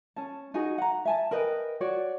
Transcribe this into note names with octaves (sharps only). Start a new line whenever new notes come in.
C#4 A5
D#4 F#4 G#4
F#5 A#5
E5 G#5 A5
A#4 B4 D#5 G5
F#4 C#5 D5